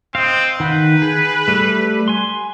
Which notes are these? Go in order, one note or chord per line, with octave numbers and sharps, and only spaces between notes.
C4 D#5 F5
D#3 B4 F#5 G6
G#4
G3 A3
G#5 C6